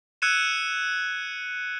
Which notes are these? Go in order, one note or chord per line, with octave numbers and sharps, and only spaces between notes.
E6 F#6 G#6 C#7 D#7 E7